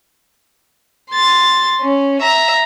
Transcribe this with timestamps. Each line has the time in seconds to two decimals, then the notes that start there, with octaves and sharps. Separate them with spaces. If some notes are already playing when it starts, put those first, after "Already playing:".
1.11 C6 A6
1.82 C#4
2.22 E5 A#5